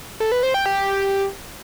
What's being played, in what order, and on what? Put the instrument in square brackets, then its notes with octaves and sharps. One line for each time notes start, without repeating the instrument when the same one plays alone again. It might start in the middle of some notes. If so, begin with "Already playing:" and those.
[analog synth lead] A4
B4
C5
G5
G4